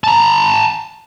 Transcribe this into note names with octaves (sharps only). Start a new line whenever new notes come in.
A5 A#5